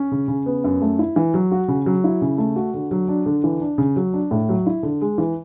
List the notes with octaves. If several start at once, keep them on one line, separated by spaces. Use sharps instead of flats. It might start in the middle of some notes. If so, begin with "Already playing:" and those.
Already playing: C#4
C#3
C#3
B3
F#2
A3
E4
E3
F#3
F#4
C#3
F#3
E4
C#3
A3
F#4
D3
F#3
D4
D3
E3
D4
C#3
F#3
D4
A2
F#3
E4
D3
G#3
E3